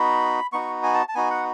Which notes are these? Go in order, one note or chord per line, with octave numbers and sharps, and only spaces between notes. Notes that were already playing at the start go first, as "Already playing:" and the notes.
Already playing: B3 D#4 F#4 B5
B3 D#4 F#4 C#6
G#5
A5
A5
B3 D#4 F#4 G#5
F#5